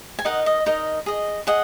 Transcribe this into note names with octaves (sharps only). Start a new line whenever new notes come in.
G#5
D#4 A#4 D#5 F#5
D#5
D#4 A#4 D#5
G#4 D#5
G#4 D#5 F#5